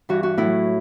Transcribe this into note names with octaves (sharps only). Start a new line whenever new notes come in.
G2 E3 F#4
F#4
A2 F#3 E4